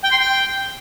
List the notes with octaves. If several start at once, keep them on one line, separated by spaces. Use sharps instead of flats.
G5
C6
G5